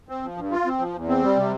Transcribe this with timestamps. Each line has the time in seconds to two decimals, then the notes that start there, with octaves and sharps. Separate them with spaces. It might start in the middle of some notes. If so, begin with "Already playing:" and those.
0.09 C4
0.23 F3
0.37 G2
0.51 F4
0.66 C4
0.79 F3
0.94 E2
1.08 C4
1.23 G3
1.37 C3